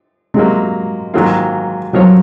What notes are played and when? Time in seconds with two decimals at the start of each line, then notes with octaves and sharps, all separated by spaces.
0.34 C3 F#3 G#3 A#3
1.14 G#2 D#3 F#3 A#3 F4
1.93 F3 F#3 C4 F4 A#4 C#5